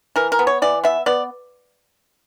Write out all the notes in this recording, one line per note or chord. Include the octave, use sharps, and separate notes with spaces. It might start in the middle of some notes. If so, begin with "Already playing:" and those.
E3 A#4
A#4
B3
C#5
E3 D5
B3 E5
B3 D5